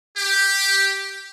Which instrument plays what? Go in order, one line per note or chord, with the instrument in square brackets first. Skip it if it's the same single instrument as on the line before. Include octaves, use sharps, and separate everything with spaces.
[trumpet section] G4